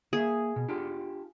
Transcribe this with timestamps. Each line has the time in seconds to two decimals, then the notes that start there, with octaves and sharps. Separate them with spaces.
0.13 A#3 G#4 E5
0.56 B2
0.69 D4 F4 G4